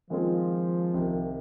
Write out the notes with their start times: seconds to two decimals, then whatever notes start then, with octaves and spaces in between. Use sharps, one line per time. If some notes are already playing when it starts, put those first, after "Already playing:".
0.10 D#3 F3 G#3 C4 F4 G#4
0.93 C2 C3 D#3